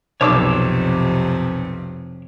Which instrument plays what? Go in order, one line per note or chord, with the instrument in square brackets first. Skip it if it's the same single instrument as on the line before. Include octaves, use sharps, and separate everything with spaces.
[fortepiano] B1 [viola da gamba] F2 C3 [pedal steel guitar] C#5 D6 E6